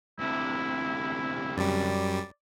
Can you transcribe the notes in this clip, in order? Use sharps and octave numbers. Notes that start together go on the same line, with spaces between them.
D2 C3 E4
F#2 G3 D5